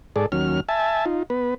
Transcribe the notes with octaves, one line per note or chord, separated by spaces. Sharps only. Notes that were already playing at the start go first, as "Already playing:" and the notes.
G#2 G#4 A4 D5
D#2 F#3 C#4 F6
E5 G#5 A5
D#4 F4
B3 B4